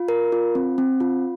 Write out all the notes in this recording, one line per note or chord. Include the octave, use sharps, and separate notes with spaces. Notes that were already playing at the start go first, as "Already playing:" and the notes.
Already playing: F4
A#4
F4
C4
C4
F4